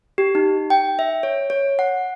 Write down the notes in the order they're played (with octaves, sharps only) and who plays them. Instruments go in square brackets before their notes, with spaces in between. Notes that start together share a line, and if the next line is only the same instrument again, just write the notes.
[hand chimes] G4
D#4
G5
E5
C#5
C#5
F#5